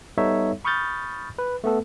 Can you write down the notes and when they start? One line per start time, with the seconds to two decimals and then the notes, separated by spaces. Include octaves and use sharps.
0.18 G3 B3 D#4 A4 C#5 E5
0.65 B5 C#6 D#6 F6 G6 A6
1.39 B4
1.64 A3 B3 A4